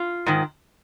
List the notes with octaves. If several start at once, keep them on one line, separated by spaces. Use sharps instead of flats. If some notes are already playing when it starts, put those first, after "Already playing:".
Already playing: F4
G#2 D#3